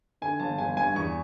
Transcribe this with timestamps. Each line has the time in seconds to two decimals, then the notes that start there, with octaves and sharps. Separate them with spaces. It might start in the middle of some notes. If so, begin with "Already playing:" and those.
0.22 D3 G#5
0.40 G1 A5
0.58 G1 G#5
0.77 G2 G#5
0.95 E2 C#6